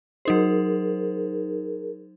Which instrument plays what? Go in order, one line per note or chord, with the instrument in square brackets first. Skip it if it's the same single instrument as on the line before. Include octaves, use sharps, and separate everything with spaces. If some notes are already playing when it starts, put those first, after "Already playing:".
[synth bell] F#3 D#4 C5 [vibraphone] G#4 A#4